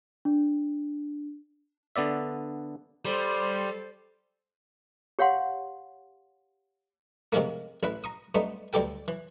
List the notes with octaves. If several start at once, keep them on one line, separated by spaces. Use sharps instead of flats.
D4
D3 B3 D5 E5
G3 A4 C5
G4 C#5 F5 F#5 C6
G#2 C3 D#3 F3 A3 A#3
A1 E4 B4
A#5 C#6 D#6
G2 A3 B3 D#4
D2 G2 G4 A4 G5
E3